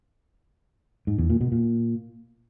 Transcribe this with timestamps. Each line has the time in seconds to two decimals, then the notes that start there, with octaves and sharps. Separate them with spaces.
1.07 G#2
1.18 E2
1.30 A#2
1.41 B2
1.52 A#2